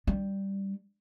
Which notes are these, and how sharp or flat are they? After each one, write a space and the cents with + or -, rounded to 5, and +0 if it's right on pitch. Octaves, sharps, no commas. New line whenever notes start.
G3 +0 D4 +0